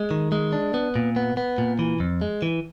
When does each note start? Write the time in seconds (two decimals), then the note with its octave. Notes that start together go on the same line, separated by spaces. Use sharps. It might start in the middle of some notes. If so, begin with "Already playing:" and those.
Already playing: G#3
0.11 D#3
0.32 G#3
0.53 D4
0.74 B3
0.96 A#2
1.16 B3
1.37 B3
1.58 A#2
1.79 E3
2.00 F2
2.21 G#3
2.42 E3